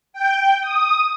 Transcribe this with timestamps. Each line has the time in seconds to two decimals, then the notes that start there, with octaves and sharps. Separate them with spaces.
0.13 G5
0.61 D#6